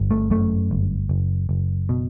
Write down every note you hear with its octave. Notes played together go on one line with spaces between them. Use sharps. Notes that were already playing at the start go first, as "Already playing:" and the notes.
Already playing: G1
A3
F#2 A3
G1
F#1
F#1
B2